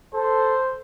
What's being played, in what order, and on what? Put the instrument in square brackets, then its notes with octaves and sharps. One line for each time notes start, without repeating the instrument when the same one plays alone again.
[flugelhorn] A4 [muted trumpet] C5